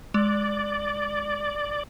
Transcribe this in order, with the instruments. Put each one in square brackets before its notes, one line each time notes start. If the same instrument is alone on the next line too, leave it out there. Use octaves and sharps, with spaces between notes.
[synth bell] G#3 [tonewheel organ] D5